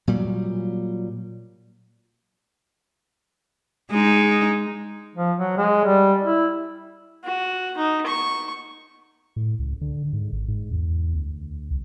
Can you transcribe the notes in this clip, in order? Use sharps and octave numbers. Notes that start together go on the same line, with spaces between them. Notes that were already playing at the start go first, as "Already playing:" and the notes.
A#2 F#3 G3
G#3 D#4
F3
F#3
G#3
G3
E4
F#4
D#4
C#6
A2
C#2
D3
G#2
G#1
G#2
E2
D2
C2